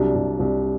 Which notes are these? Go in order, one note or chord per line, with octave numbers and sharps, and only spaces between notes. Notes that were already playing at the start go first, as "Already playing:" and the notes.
Already playing: C2 F#3 D4
C2
C2